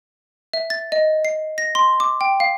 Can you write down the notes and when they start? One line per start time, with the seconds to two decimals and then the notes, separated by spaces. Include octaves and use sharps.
0.53 E5
0.70 A6
0.92 D#5
1.25 C7
1.58 A#6
1.75 C6
2.00 D6
2.21 G5
2.40 F5